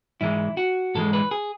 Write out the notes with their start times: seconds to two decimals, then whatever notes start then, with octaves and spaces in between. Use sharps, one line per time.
0.21 G#2 E3 G#3 E4
0.57 F#4
0.95 G#2 E3 G#3 A4
1.13 B4
1.31 G#4